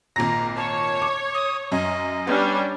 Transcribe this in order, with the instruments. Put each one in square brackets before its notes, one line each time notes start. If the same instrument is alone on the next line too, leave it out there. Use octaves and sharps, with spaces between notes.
[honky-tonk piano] G#1 A#2 A#6 [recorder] A#5
[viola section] C#5 [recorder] A5
[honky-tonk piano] D6
[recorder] D#6
[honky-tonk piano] F#2 [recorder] D#5
[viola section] G3 C#4 D4 [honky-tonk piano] B3